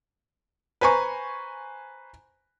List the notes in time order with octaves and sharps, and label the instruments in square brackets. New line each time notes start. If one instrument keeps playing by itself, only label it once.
[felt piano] B4 C5 G#5 A#5 C#6